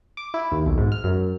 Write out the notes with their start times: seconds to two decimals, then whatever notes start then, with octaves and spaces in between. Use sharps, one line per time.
0.17 D6
0.34 E4
0.52 D#2
0.66 B1
0.78 G#2
0.92 F6
1.04 F#2